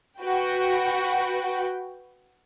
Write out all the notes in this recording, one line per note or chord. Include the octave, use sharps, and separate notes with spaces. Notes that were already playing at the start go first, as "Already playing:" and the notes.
F#4 B4 G5